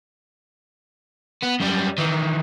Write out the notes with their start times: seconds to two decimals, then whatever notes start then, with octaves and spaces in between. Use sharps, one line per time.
1.43 B3
1.60 F#2 G3
1.98 D#3 E3